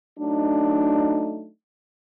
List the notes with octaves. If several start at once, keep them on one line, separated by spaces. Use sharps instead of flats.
F#3 A3 D4 D#4